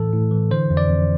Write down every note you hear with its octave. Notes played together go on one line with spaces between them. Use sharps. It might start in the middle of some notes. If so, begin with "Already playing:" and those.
Already playing: A2 E3 A4
A2
E3
D3 C5
F2
D5
F2